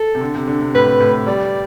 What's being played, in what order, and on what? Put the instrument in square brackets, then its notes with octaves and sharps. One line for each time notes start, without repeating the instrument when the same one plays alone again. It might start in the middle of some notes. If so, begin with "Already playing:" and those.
Already playing: [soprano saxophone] A4
[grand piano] C3
D3
C3
D3
C3
[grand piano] A2 [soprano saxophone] B4
[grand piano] A2
[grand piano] G3 [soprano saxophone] D5